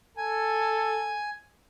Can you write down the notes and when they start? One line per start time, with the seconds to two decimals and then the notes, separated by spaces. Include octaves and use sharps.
0.17 A4 G#5